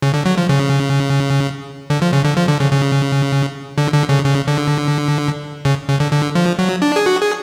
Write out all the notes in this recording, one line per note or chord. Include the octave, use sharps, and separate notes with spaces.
C#3
D3
F#3
F3
C#3
D3
F3
C#3
D3
F3
D3
C#3
C#3
D3
D3
C#3
C#3
D3
C#3
C#3
D3
D3
F3
F#3
D4
G#4
F#4
G#4